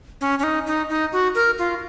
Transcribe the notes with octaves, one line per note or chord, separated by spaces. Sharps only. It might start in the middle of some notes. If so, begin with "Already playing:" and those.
C#4
C#4
D#4
D#4
D#4
F#4
A#4
F4